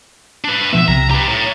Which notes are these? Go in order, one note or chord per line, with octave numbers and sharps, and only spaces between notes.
D4 B4
B2 F3 B3 E5
C2 C3 A#5
G4 B4 A#5
A2